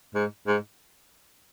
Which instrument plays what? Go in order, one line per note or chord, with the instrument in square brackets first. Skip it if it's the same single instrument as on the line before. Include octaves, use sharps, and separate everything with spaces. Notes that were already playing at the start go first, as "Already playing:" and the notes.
[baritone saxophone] G#2
G#2